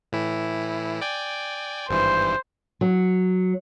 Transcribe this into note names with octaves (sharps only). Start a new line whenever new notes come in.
A2 E3 E4
D5 G5 G#5
G#1 G2 E3 C5
F#3